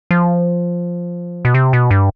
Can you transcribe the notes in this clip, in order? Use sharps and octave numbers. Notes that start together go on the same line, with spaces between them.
F3
B2
C3
B2
G2